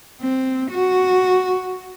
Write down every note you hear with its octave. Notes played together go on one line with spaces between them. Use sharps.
C4
F#4